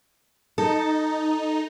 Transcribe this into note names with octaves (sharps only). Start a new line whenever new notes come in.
D#4 A4